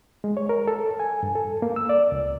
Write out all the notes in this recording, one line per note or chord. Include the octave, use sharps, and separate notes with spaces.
G#3
C#5
A#4
A4
G#5
G2
A4
A#3
E6
D5
C#2